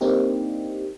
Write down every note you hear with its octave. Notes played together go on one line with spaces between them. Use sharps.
A#3 C4 D4 D#4 G4